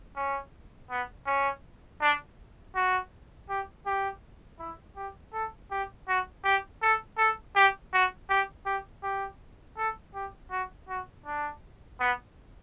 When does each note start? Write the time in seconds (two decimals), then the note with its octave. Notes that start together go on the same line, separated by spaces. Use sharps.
0.16 C#4
0.90 B3
1.26 C#4
2.01 D4
2.75 F#4
3.49 G4
3.86 G4
4.59 E4
4.96 G4
5.33 A4
5.71 G4
6.08 F#4
6.44 G4
6.82 A4
7.18 A4
7.56 G4
7.93 F#4
8.30 G4
8.66 G4
9.03 G4
9.78 A4
10.15 G4
10.51 F#4
10.89 F#4
11.26 D4
12.00 B3